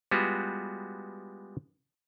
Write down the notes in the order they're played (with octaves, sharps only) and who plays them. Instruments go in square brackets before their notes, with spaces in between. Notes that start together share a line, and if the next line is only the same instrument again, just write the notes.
[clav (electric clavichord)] G3 G#3 B3 F4 F#4